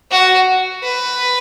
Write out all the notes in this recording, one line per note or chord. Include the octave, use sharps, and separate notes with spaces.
F#4
B4